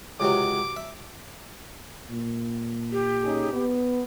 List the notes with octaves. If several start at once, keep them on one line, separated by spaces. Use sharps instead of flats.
C#2 C3 F#3 D6
E5
A#2
G4
C#4 D#4 G#4
B3